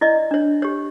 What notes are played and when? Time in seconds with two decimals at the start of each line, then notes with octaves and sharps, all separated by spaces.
0.01 E4 D5 D#5
0.31 D4 C#5
0.62 G4 C#5